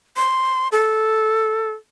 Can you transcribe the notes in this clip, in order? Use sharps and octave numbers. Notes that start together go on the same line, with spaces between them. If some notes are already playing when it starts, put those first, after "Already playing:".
C6
A4